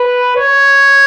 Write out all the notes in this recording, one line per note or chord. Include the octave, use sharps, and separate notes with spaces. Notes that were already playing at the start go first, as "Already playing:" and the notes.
Already playing: B4
C#5